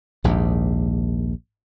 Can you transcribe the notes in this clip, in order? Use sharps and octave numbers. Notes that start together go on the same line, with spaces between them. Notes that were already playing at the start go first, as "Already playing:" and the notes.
A#1 D#2 G#2